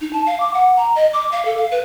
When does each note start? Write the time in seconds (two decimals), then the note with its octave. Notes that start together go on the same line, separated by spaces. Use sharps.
0.01 D#4
0.13 A5
0.26 F5
0.40 D6
0.54 F#5
0.77 A#5
0.96 D#5
1.13 D6
1.32 F5
1.45 A4
1.58 F5
1.71 B4